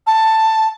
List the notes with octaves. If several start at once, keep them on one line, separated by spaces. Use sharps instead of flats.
A5